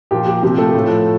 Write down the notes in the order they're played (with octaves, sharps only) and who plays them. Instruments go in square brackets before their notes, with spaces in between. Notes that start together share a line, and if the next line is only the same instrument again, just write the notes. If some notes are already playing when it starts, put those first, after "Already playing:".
[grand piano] A#2 F3 G4
G4
C3 F3 G4
A3 A4
A2 F3